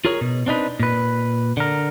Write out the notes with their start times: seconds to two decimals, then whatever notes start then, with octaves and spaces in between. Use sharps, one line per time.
0.05 F4 G#4 A#4 C#5
0.21 B2
0.46 C4 D4 D#4 B4
0.80 A#2 B4
1.57 D3 A#4